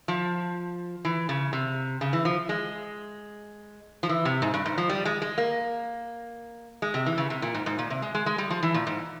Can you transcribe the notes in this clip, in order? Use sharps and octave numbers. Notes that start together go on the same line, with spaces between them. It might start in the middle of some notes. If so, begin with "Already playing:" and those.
F3
E3
C#3
C3
C#3
E3
F3
G#3
F3
E3
C3
G#2
G2
G#2
F3
G3
G#3
G#3
A#3
G#3
C3
E3
C#3
C3
A#2
G#2
G#2
A#2
C3
G#3
G#3
G#3
G3
F3
E3
A#2
G#2